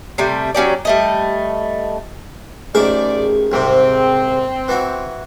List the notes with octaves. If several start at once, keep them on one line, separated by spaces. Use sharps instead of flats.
C3 G3 A3
F#3 C#4 G4 D5
G3 A3 D#5
A1 D#3 G#4 C5 D5
C2 G#2 C3 C4
E3 F#4